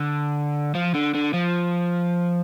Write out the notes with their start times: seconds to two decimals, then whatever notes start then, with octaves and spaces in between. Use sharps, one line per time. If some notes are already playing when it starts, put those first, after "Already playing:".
Already playing: D3
0.75 F3
0.95 D3
1.15 D3
1.33 F3